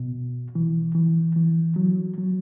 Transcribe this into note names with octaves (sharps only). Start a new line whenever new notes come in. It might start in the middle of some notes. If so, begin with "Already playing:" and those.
Already playing: B2
E3
E3
E3
F#3
F#3